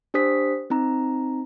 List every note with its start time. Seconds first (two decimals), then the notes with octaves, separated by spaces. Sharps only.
0.14 D4 G4 C5 D#6 B6
0.70 C4 D#4 A#5